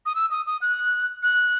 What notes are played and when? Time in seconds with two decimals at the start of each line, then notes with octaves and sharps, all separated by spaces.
0.06 D#6
0.15 E6
0.31 D#6
0.46 D#6
0.62 F#6
1.23 F#6